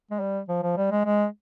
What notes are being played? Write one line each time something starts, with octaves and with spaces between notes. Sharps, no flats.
G#3
G3
F3
F3
G3
G#3
G#3